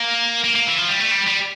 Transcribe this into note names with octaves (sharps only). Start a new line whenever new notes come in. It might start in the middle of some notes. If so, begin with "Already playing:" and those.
Already playing: A#3
A#3
A#3
E3
F3
G3
A3
G3
G3